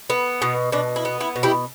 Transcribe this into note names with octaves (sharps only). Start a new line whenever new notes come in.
B3
B2
B2 D4
E4
B3
E4
B2
E4 G4